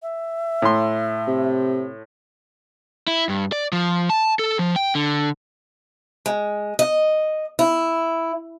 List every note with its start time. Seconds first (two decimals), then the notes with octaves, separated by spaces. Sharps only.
0.03 E5
0.62 A2 C6
1.27 C3
3.07 E4
3.29 G2
3.52 D5
3.73 F3
4.10 A5
4.39 A4
4.59 F3
4.76 G5
4.95 D3
6.26 G#3
6.79 D#5
7.59 E4